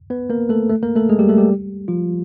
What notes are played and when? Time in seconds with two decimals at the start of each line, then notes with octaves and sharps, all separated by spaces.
0.10 B3 B4
0.30 A#3 A#4
0.49 A3 A4
0.69 A3 A4
0.83 A#3 A#4
0.96 A3 A4
1.09 G#3 G#4
1.19 G3 G4
1.29 A3 A4
1.38 G3 G4
1.88 F3 F4